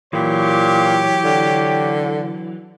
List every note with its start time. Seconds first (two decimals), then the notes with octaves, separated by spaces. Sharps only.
0.13 A#2 E3 F#3 G4 C#5
1.24 D3